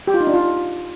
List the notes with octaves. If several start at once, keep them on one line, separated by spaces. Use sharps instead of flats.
G4
F4
D#4
D4
F4